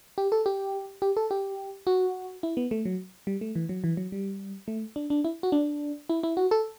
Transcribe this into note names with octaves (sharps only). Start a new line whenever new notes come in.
G4
A4
G4
G4
A4
G4
F#4
E4
B3
A3
F#3
G3
A3
E3
F#3
E3
F#3
G3
A3
D4
D4
E4
F#4
D4
E4
E4
F#4
A4